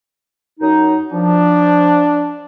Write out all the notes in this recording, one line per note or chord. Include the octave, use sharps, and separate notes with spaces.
F#2 F#3 D#4
F3 D4